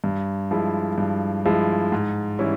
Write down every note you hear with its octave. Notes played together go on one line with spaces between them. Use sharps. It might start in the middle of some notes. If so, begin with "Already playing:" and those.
G2
F3 G#3 E4
G2
F3 G#3 E4
G#2
E3 G3 C#4 E4